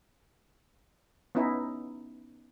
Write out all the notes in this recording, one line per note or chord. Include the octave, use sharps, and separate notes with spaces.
B3 C#4 D#4 E4